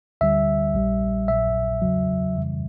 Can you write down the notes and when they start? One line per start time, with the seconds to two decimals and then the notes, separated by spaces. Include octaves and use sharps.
0.21 D2 D3 G3 E5
0.74 A#1 A#2 G3
1.28 A#1 A#2 F#3 E5
1.82 E2 C#3 F#3
2.36 F2 C#3 E3 G3